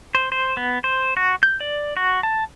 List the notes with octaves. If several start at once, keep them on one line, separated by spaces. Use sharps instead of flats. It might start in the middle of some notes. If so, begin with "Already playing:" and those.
C5
C5
B3
C5
F#4
G6
D5
F#4
A5